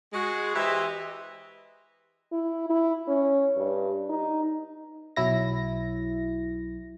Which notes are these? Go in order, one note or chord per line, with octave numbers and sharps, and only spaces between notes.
G#3 F#4 G#4
E3 G4 B4 C5 D#5 E5
E4
E4
C#4
G2
D#4
B1 F#3 E4 A#6